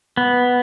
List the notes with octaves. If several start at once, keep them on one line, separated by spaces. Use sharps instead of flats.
B3